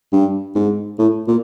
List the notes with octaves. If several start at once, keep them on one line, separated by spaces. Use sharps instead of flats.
G2
G#2
A2
A#2